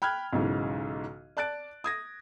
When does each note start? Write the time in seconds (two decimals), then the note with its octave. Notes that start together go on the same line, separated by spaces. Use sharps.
0.02 G5 B5 F6 F#6 G#6
0.33 B1 G#2 C#3 E3
1.37 D5 A5 F#6 A6 D7
1.84 D#6 G#6 A#6